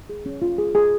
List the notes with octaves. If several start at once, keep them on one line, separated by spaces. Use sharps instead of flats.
G#4
C#4
F4
G#4
G#4